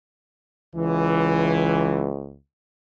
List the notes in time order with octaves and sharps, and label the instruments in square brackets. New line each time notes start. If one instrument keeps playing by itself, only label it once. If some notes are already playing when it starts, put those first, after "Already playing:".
[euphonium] C#2 [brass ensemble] E3